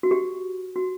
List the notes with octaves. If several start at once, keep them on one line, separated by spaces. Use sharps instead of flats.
F#4
G4
F#4